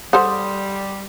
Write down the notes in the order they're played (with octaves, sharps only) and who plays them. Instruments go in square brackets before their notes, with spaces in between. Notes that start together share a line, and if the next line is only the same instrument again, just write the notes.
[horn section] G3 [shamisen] A4 C5 F#5 [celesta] C6 D#6